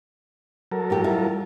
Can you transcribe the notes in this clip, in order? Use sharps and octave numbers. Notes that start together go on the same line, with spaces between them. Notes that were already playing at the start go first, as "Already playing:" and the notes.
F#3 A4 A#4
A2 E3 G4
G3 E4 F4